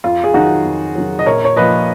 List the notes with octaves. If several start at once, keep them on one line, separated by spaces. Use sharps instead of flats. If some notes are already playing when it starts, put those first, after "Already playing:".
F2 F4
G#4
D#3 F#3 D#4 F#4
F2
D#3 F#3
D#5
A#1 A#4 C#5
C#5
A#2 F3 B4 D#5